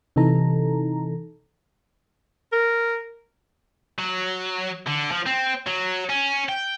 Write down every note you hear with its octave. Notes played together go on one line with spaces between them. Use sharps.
C3 E3 D#4 A4 A#5
A#4
F#3
D3
F3
C4
F#3
C#4
G5